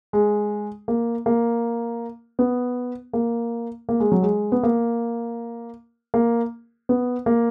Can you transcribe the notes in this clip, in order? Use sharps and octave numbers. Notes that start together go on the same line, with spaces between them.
G#3
A#3
A#3
B3
A#3
A#3
G#3
F#3
G#3
B3
A#3
A#3
B3
A#3